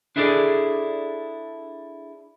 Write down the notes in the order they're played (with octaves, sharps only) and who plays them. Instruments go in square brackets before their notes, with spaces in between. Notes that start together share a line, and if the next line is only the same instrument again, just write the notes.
[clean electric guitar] D4 E4 G#4 A4 B4 D5